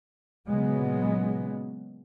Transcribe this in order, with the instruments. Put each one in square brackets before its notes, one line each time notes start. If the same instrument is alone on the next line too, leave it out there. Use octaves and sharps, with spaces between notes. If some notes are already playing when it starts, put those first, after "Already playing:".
[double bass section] A#2 C#3 F#3 G#3 B3